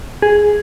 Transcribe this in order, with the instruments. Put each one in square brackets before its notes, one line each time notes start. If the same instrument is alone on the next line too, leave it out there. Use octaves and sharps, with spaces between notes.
[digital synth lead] G#4